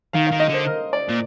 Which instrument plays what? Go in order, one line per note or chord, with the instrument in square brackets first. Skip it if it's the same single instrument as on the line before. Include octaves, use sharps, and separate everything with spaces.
[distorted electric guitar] D#3 [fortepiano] F5
[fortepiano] F5
[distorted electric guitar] D#3
[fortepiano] D#5
[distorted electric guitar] D3
[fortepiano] C5
A#4
D5
[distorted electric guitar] A#2